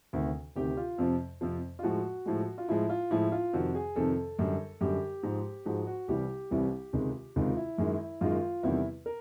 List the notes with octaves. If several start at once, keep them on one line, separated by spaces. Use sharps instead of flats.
D2 C3 D#3
D2 C3 D#3 G4
F4
F2 C3 F3
F2 C3 F3
F4
A2 F3 G#3 F#4
A2 F3 G#3
F4
A2 F3 G#3 E4
F4
A2 F3 G#3 E4
F4
F2 C3 D#3 F#4
G#4
F2 C3 D#3 A4
F#2 D3 G3
F#2 D3 G3 G4
G#2 F3 G#3
G#2 F3 G#3 F#4
F#4
C2 C3 E3 G3 G4
C2 C3 E3 G3
C#2 C3 D#3 G#3
C#2 C3 D#3 G#3 F4
E4
F#2 D#3 G#3
F#2 D#3 G#3 F4
E2 C3 D#3 G3 E4
A#4